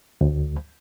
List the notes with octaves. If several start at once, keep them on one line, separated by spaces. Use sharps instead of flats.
D2